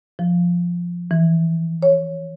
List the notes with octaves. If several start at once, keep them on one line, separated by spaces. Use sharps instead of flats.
F3
E3
C#5